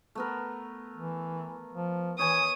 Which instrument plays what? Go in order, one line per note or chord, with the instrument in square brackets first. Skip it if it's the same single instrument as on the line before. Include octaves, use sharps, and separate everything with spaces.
[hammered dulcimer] A3 B3 A#4
[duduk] E3
F3
[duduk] E3 [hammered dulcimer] C#5 G#5 [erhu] D#6